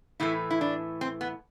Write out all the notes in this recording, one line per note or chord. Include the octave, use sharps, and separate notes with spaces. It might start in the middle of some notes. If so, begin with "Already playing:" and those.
A2 E3 A3 E4
E4
D4
C4
B3